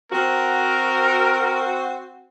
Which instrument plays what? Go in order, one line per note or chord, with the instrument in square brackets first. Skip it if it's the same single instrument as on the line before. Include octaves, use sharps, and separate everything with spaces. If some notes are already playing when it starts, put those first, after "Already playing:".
[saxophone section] C4 F#4 [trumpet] A#4